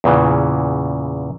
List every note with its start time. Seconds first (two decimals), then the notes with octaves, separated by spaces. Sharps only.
0.04 E2 A#2 C#3 E3